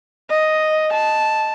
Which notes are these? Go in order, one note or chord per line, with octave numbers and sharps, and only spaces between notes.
D#5
A5